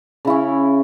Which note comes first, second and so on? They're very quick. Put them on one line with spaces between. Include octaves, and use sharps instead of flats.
C#3 E4 C#4